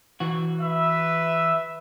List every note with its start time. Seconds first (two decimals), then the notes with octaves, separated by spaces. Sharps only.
0.20 E3 F#4
0.60 B4 E5